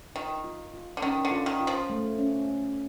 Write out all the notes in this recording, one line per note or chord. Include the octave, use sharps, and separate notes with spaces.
D#3 F4
F4
F4
D3
D#3 C#4
D3
F4
D#3
F4
F3
A3
C#4
A3